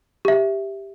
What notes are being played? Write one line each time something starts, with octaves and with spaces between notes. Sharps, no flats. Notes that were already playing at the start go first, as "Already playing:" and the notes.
G4 E5